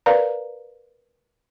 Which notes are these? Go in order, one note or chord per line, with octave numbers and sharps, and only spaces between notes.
A#4 B4 D5 F5 A#5